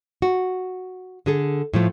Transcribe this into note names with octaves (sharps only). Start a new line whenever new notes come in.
F#4
D3 G#4 A4
A2 F3 A3